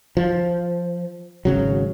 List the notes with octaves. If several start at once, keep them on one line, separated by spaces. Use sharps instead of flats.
F3
G#1 C#3 F#3